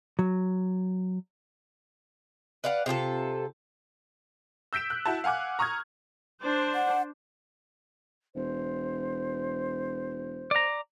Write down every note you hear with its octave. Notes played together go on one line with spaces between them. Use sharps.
F#3
B4 D5 F5 F#5
C3 F4 G4 A4
E6 G6 B6 D7 E7
F#6
E4 F#4 A5
F5 F#5 G#5 D6 F#6
A#5 C#6 D#6 F6 G#6
D4 C5
F#5
E1 C5
D5 A#5